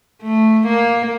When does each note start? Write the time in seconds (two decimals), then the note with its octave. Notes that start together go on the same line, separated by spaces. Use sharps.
0.22 A3
0.67 A#3